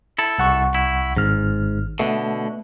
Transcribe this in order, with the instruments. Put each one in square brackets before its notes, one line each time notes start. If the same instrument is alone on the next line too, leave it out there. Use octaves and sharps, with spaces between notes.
[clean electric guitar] E4 A4
[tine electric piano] C2 F#5 C#6
[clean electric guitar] E4
[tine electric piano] G#1 F6 [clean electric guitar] G#2
[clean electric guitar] B2 D3 [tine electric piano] A3